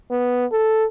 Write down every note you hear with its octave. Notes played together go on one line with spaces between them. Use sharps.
B3
A4